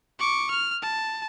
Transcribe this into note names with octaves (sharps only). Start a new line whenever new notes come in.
C#6 D6
F6
A5